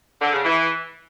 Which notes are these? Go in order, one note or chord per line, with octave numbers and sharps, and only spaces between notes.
D3
C#3
E3